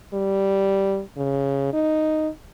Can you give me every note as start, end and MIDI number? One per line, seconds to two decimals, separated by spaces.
0.14 1.02 55
1.17 1.71 49
1.73 2.29 63